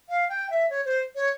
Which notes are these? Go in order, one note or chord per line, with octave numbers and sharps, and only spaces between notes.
F5
G5
E5
C#5
C5
C#5